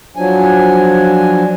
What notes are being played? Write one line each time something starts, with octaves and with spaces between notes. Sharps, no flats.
F3 F#3 D4 G#5